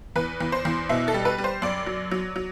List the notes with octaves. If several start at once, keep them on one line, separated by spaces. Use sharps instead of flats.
E2 B4
E2
C5
E2
B2 E5
A4
G3
B4
G3
C5
F#2 D5
F#3
F#3
F#3